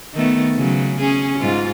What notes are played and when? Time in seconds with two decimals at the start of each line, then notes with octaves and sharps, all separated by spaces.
0.15 D#3 A3 B3
0.55 C#3 F#3
1.00 C#4 G#4
1.39 G#2 F4